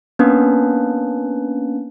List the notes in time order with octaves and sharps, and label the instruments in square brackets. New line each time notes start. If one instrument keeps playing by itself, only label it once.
[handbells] A#3 B3 C#4 D4 B4